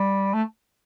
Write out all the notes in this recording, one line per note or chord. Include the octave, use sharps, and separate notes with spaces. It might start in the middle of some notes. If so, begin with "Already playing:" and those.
Already playing: G3
A3